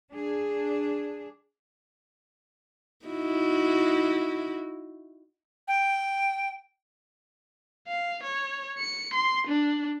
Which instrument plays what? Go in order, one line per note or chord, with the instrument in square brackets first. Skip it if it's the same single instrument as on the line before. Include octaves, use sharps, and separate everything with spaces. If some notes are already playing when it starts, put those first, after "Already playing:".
[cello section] D4 G#4
[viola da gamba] D#4 E4 F#4
[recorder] G5
[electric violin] F5
C#5
C#7
C6
D4